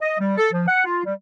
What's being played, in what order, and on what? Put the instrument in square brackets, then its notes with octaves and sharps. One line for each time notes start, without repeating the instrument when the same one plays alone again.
[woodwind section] D#5
G3
A4
F3
F#5
F4
G3